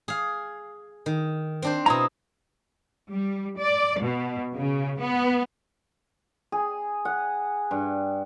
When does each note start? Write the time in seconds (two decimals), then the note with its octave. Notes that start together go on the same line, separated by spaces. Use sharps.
0.08 G#4 F5
1.06 D#3
1.62 C4 D4 C5
1.86 B2 E4 A#5 D#6
3.10 G3
3.59 D5
4.02 B2
4.56 C#3
4.99 B3
6.52 G#4
7.05 F#5
7.71 G2